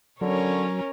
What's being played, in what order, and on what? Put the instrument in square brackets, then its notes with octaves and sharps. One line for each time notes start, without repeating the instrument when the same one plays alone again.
[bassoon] D3 [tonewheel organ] F#3 [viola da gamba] C#4 A#4 C#5